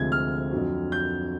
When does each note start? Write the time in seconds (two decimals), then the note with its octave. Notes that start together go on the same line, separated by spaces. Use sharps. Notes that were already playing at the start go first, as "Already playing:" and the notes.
Already playing: D2 C3 F3 G#3 G#6
0.12 F6
0.51 F2 D3 F#3
0.92 G6